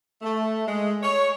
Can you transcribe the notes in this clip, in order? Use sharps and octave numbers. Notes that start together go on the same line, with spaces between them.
A3
G#3
C#5